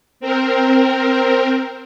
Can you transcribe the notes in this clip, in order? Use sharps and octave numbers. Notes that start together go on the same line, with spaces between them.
C4 A#4